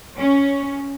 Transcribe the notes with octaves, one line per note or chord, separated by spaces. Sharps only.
C#4